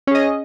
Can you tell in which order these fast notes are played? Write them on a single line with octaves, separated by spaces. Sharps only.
C#4 G#4 D#5